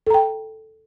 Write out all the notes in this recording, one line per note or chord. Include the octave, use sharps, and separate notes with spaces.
A4 G5 A#5